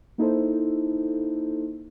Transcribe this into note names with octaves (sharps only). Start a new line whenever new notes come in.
A#3 D#4 E4 A4 C5